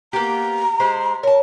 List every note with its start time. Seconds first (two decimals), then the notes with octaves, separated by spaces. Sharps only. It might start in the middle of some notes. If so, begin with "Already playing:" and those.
0.13 A#3 B3 G4 A#5
0.80 G#3 G4 C5
1.23 A#4 C#5 A5